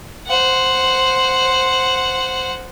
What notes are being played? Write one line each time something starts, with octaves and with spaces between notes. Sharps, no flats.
C5 F#5